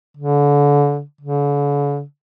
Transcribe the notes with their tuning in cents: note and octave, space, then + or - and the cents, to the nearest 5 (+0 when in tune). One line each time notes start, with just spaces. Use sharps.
D3 -30
D3 -45